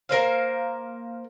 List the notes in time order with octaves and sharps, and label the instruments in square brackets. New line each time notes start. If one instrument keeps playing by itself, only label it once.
[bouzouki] A#3 A#4 C5 F5